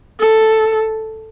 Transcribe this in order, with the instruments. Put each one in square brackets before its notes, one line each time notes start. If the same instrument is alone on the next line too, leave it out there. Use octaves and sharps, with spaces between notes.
[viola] A4